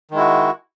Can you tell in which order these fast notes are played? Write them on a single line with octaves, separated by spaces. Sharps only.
D#3 G#3 E4 F#4